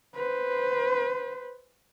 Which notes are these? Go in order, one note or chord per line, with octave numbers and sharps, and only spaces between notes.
B4 C5